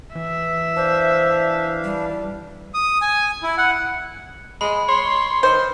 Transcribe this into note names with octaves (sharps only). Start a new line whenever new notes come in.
E3 E5
D4 C5 F5
G3
D#6
G#5
E4
F#5
G#3 B5
C#5 C6
D#3 C5